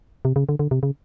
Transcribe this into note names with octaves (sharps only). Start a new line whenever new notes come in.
C3
C#3
D3
D3
C3
C#3